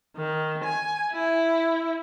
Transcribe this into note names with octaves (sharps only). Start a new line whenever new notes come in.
D#3
G#5
E4